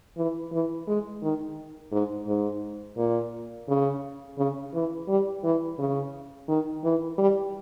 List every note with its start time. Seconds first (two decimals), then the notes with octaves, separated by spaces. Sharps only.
0.17 E3
0.52 E3
0.88 G#3
1.23 D#3
1.92 G#2
2.27 G#2
2.97 A#2
3.69 C#3
4.38 C#3
4.74 E3
5.08 G3
5.44 E3
5.79 C#3
6.48 D#3
6.84 E3
7.18 G3